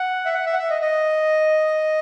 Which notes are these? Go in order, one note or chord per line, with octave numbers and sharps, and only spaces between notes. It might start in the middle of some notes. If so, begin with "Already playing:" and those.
Already playing: F#5
E5
F#5
E5
F#5
E5
D#5
D#5